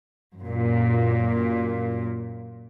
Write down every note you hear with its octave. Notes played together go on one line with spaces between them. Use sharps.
F#2 A#2